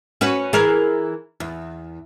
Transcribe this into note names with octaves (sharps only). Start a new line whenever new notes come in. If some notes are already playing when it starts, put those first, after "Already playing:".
C#4 F#4 B4
E3 G#4 A#4
E2